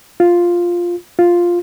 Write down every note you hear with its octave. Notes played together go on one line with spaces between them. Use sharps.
F4
F4